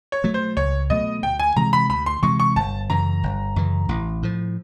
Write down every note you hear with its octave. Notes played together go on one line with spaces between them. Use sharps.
C#5
B2 F#3 A3
C5
C#2 C#5
B2 F#3 A3 D#5
D2 G5
G#5
C3 E3 G#3 A#5
B5
D2 B5
C6
C3 E3 G#3 C#6
C#6
G1 A5
F#2 C#3 E3 A#5
G1
F#2 C#3 E3
A1
A2 F3